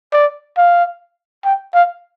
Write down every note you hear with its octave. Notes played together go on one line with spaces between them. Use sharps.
D5
F5
G5
F5